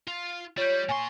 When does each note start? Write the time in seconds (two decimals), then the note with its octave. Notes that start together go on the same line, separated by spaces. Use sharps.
0.07 F4
0.57 G3 F4 C#5 G6
0.89 A#2 G#5 C6 C#6 C7